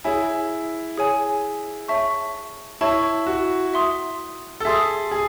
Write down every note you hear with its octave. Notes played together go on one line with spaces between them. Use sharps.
E4 G#4 C#5 G#5
G#4 C#5 G#5
C#5 E5 A5 C#6
E4 C#5 E5 A5 C#6
F#4
E5 C6 D#6
A4
G#4 E5 C6 D#6
G#4